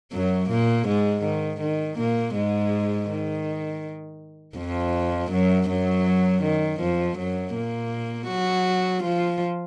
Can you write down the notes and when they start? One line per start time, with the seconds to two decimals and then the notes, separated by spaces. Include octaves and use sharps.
0.13 F#2 F#3
0.49 A#2 A#3
0.87 G#2 G#3
1.24 D#3
1.61 D#3
1.98 A#2 A#3
2.35 G#2 G#3
3.10 D#3
4.57 F2 F3
5.31 F#2 F#3
5.69 F#2 F#3
6.43 D#3
6.80 F2 F3
7.17 F#2 F#3
7.54 A#2 A#3
8.28 F#3 F#4
9.03 F3 F4